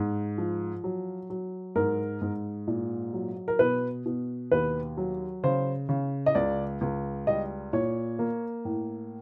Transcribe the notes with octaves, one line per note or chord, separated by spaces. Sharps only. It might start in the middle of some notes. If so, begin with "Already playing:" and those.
Already playing: G#2
F3
F#3
F#3
G#2 A#4
G#2
A#2
F#3
A#4
B2 B4
B2
D#2 B4
F#3
C#3 C5
C#3
D#5
C#2 D5
C#2
G3 D#5
A#2 C#5
A#3
A2